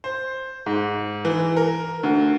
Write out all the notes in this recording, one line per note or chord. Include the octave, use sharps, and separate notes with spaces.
C5
G#2
E3
A#4
D2